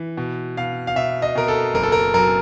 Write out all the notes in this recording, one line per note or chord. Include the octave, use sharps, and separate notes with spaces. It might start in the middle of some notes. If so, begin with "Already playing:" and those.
Already playing: E3
B2
B2 F5
F5
B2 E5
D#5
B2 A#4
A4
F#1 A#4
A4
A#4
F#2 A#4